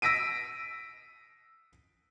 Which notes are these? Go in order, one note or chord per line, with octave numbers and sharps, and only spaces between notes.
E6 A#6 B6 D7 D#7